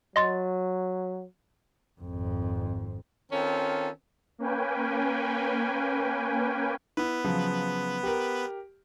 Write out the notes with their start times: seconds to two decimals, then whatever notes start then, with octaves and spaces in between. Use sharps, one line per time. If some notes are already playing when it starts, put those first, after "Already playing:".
0.16 F#3 D#5 C6 A6
2.01 G#1 F2
3.32 D#3 C4 C#4 F4 A4
4.39 A#3 C#4 B4 G5 G#5
6.97 B3 E4 B4
7.24 C#3 F3 F#3
8.03 G4 A#4